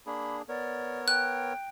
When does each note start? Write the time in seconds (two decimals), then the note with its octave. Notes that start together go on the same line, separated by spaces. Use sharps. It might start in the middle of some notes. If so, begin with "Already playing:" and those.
0.06 A#3 D4 G#4 B5
0.49 B3 A#4 C#5 D5
1.08 G5 F#6